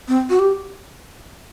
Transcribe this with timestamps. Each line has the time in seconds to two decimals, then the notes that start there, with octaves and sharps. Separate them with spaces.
0.08 C4
0.29 F#4
0.39 G4